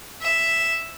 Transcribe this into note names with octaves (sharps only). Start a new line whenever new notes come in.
E5